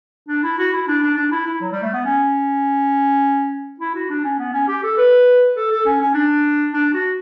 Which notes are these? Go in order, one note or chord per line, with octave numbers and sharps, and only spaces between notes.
D4
E4
F#4
E4
D4
D4
D4
E4
E4
F#3
G3
A3
B3
C#4
E4
F#4
D4
C#4
B3
C#4
G4
A4
B4
A4
A4
C#4
C#4
D4
D4
F#4